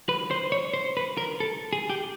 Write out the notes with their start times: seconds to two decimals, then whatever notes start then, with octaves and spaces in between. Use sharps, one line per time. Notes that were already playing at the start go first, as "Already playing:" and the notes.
0.09 B4
0.31 C5
0.52 C#5
0.74 C5
0.97 B4
1.17 A#4
1.40 A4
1.73 G#4
1.90 G4